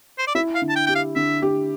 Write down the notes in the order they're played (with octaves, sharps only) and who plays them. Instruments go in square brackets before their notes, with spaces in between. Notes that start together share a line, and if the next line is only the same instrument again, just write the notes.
[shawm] C5
D5
[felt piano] E4 [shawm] E5
[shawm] F5
[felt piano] D3
[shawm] A5
G5
[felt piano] G4 [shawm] G5
[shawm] F5
[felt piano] D3 [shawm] E5
[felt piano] G4